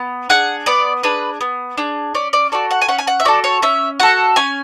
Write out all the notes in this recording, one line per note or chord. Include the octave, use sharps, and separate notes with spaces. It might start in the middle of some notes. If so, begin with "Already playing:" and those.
Already playing: B3
D4 G#4 F#5
B3 D5
D4 G#4 B4
B3
D4 G#4
C#4 D5
D5
F#4 A4 D5
F#5
G#5
C#4 F#5
G#5
F#5
E5
F#4 A4 D5
C#5
C#4 E5
F#4 A4 F#5
C#4 G#5